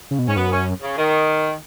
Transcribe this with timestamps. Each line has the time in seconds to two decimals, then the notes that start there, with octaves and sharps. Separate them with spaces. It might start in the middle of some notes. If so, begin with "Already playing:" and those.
0.11 C#3
0.19 B2
0.28 G#2 C#4
0.36 F#2 B3
0.51 C#4
0.82 C#3
0.98 D#3